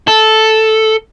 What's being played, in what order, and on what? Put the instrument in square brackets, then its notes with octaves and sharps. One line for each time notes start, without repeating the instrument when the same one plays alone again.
[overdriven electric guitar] A4